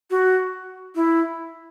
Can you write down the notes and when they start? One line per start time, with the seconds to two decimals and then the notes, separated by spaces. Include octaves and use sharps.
0.11 F#4
0.95 E4